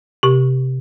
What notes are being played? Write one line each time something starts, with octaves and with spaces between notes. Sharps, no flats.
C3 G4